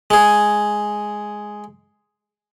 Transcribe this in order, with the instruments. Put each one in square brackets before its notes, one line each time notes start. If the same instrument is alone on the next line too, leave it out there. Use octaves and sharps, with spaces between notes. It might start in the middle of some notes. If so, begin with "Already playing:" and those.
[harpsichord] G#3 G#4